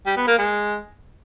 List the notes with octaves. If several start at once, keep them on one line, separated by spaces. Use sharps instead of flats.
G3
B3
A#3
G#3